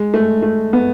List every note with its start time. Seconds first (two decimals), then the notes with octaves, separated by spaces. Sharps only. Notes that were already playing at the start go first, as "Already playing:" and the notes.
Already playing: G#3
0.14 A3
0.43 A3
0.73 B3